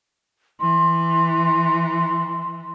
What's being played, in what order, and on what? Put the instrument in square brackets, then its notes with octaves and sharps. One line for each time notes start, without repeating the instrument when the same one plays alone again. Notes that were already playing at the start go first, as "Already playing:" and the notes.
[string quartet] E3 [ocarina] C6